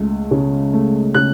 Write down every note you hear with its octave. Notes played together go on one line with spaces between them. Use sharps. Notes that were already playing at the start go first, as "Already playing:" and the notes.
Already playing: C#2 A3
C#3
A3
C#3 F#6